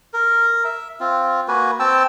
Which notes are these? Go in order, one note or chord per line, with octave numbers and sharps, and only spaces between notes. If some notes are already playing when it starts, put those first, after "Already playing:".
A#4
E5
C4 F4
A#3 F#4 B4 G#5
C4 G5 A5 E6